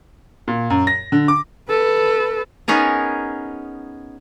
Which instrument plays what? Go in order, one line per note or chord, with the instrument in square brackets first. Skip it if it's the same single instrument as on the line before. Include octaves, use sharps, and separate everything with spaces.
[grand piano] A#2
F#2
A#6
D3
D6
[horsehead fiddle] A4 B4
[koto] B3 C#4 D#4 G#4 A#4